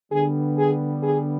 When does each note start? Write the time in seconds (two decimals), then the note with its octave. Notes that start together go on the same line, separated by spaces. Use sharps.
0.11 D3 G3 B3 G#4
0.57 G#4
1.03 G#4